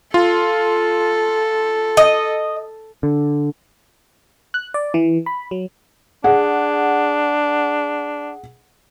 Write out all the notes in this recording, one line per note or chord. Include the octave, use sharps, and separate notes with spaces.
F4 A4
D#5
D3
F#6
D5
E3
B5
F#3
D4 G#4 F#5